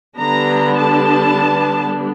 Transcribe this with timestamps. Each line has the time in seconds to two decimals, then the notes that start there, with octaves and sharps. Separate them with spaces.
0.17 D3 G3 B3 D4 A#5
0.76 A5